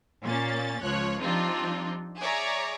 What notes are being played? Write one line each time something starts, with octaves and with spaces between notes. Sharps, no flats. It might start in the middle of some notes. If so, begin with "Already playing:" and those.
A#2 A#3 C#4 A6
C#2 F3 C#5 F#6
F3 G3 C4 D4 D#4 F4
G#4 C#5 D5 E5 A#5 D6